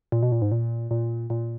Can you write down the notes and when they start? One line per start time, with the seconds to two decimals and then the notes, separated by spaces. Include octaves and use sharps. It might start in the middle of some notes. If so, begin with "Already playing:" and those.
0.12 A#2
0.23 B2
0.32 A#2
0.42 G#2
0.52 A#2
0.91 A#2
1.30 A#2